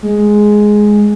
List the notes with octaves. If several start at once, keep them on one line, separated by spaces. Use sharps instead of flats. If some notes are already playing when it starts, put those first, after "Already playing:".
G#3